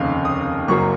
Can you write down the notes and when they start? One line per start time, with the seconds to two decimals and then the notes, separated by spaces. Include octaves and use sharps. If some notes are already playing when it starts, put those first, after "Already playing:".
Already playing: F1 D#2 C#3 F5
0.25 D#6
0.68 F#1 F#2 C#3 F#3 A#3 C#6